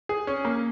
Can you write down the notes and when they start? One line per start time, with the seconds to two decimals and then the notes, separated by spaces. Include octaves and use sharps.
0.09 G#4
0.27 C#4
0.45 A#3